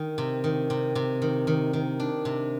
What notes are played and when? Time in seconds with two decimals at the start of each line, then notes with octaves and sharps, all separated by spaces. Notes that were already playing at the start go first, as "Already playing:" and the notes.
Already playing: D#3
0.18 C3
0.44 D#3
0.70 C3
0.95 C3
1.22 D#3
1.47 D#3
1.73 D#3
2.00 D4
2.25 C3